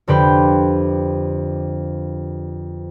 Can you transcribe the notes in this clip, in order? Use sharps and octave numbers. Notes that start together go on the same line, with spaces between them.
F2 D3 G4 B4 C5